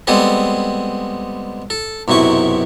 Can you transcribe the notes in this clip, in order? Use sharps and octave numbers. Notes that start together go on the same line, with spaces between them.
G3 G#3 B3 C4 G#4 A4
A4
B1 F#2 C3 E4 C#6